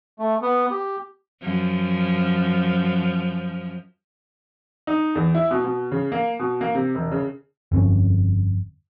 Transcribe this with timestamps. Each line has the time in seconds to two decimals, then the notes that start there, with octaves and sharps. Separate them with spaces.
0.19 A3
0.42 B3
0.71 G4
1.42 F#2 F3
4.87 D#4
5.15 E2
5.35 E4
5.51 B2
5.64 B2
5.92 C#3
6.12 A#3
6.39 B2
6.61 A#3
6.75 C3
6.95 E1
7.12 C#3
7.72 G1 F2 C4 C#4